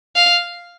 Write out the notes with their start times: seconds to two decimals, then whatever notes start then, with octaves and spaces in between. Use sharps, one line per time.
0.16 F5